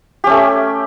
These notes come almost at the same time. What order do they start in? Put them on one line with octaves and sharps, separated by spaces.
G4 C#4 A3